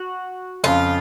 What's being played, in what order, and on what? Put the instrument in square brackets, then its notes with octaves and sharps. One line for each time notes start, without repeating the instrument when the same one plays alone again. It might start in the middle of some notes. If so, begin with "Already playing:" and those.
Already playing: [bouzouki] F#4
[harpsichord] F2 C#3 F3 [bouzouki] F4